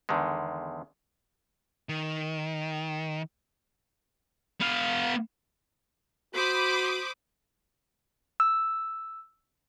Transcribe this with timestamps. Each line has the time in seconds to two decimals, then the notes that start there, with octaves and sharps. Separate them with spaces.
0.09 E2 D3 D#3 G#3
1.89 D#3
4.60 B3 F5
6.35 F#4 C5 B5 D6 D#6
8.40 E6